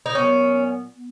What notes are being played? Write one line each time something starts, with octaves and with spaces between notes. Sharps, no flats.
D#4
A#2 F#3 B3 C#4
B3